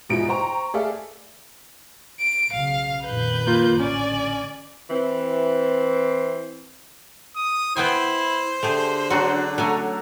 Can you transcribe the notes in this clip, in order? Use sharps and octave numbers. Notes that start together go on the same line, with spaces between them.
E2 G#2 B2 F3 E4 D7
C5 G5 A#5 C#6
A3 G#4 A4 D5 E5 F5
D7
B1 C#3 F5
F2 A#2 D#3 B4 G6
A#3 F4
A1 D3 C#4 D5 G#5
E3 C4
D#6
B3 E4 C5 G5 G#5
D3 A3 G4 G#4
F#3 C#4 D4 F#4
F#3 A3 C#4 G#5 A#5